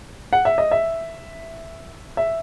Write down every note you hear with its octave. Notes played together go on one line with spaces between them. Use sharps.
F#5
E5
D#5
E5
E5